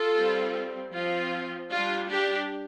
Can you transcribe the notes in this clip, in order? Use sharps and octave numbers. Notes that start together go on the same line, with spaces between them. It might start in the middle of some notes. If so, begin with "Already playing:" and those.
Already playing: F4 A4
G3 C4
F3 C4 F4
G3 D4 F4
D4 G4